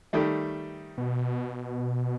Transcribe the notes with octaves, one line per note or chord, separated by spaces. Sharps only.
D#3 G3 A3
B2